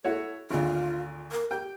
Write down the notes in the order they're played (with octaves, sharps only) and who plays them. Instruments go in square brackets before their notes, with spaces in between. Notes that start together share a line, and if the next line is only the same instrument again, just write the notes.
[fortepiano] E4 F#4 C#5 [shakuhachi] A4
[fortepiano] G#1 D2 [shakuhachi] F4
[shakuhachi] A#4
[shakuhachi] G4 [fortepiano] G5